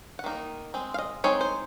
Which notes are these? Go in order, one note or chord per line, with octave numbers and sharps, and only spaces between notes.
F#5
D#3 A#3 D#4
G#3 C4
F5
D#5
G#3 C4 D#4 C#5
C5